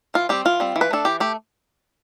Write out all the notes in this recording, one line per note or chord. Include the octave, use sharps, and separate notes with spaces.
E3 F4
G3 C4 G4
E3 F4
G3 C4
E3
B4
A3 D4 A4
E3 G4
A3 G4